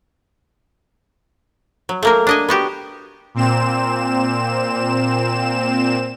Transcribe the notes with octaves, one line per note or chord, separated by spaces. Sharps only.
F#3
A3 A#3 A#4
D4 D#5 G#5
B3 F#4 G4
A#2 C4 E7